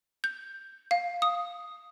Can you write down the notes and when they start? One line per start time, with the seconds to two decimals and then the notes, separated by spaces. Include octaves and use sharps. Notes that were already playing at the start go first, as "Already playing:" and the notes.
0.24 G6
0.91 F5
1.22 D#6